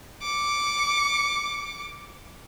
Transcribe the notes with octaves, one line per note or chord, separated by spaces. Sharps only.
D6 C#7